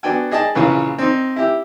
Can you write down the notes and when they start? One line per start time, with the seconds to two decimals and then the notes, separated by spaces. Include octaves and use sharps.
0.03 B3 D4 F#4 G5 G#5
0.31 G#4 D#5 G5 A5
0.55 A#1 C#3 E3 C#4 B4
0.98 C4 D#4
1.36 E4 G4